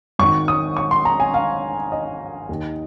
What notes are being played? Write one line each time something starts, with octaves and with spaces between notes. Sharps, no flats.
G#1 G#2 D#3 C#6
D#6
C#6
C6
A#5
G#5
F5
D#5
D#2 D#3